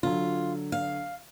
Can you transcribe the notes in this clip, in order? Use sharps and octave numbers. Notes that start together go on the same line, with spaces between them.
D3 F#3 F4
F5